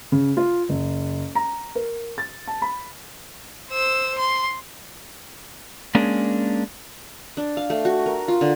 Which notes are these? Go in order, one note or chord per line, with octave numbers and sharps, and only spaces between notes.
C#3
F4
F#1
A#5
A#4
A6
A5
B5
C5 E6
C6
G#3 A#3 C#4 D4 G#4 A#4
D4
F5
A3
F#4
A#4
F4
D3